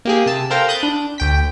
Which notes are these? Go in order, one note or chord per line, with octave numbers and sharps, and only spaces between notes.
A#3 G4 G#4
C3 A5 E6
A4 A#4 C5 F5 G5 A#5
B5 D#6 F#6 G6 A6
D4
D2 G5 B6